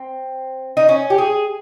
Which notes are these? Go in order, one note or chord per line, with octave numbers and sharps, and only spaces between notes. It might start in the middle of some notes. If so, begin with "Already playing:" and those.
Already playing: C4
D#4
C#4
G4
G#4